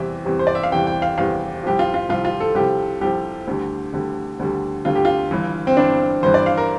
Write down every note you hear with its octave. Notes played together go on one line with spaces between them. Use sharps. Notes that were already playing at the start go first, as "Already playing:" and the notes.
Already playing: E2 C3 E3 G3 E5
E2 C3 E3 G3
C5
D5
E5
F5
E2 C3 E3 G3 G5
G5
F5
E2 C3 E3 G3 F5
C2 C3 F3 G4
F4
F4
C2 C3 F3 F4
F4
A4
C2 C3 F3 G4
C2 C3 F3 G4
D2 D3 G3
D2 D3 G3
D2 D3 G3
D2 D3 G3 F4
G4
F4
G1 G2 E3
C4
G1 G2 E3 D4
G1 G2 E3 C5
D5
F5
A#4